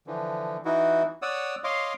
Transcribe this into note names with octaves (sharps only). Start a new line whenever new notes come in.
D3 E3 F3
E3 D#4 E4 F#4
C#5 D5 F#5 D#6 E6
C#5 D#5 F5 C6 D6